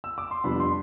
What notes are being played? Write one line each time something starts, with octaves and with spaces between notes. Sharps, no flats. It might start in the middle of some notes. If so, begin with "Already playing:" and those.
E6
D6
C6
F2 C3 G3 B3 D4 B5
C6